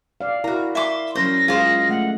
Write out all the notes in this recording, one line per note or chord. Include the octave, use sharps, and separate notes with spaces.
D5 F5
E4 F#4 A#4 A#5
E5 C6 D6
F#3 C#4 A#4 C5 A#6
G#3 F4 G#4 C5
A3 F#5